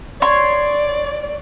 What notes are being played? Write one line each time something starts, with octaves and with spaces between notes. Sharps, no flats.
C#5 D5 C6